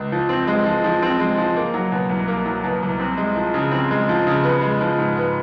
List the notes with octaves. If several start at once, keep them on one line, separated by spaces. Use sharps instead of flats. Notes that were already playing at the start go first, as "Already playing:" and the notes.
Already playing: C#2
F3
C4
G#3
F3
F3
C4
G#3
F3
A#3
F#3
B2
C2
A#3
F#3
B2
C2
C4
G#3
F3
C#3
C4
G#3
F3
C#3
B3
G#3
F3
G#2
B3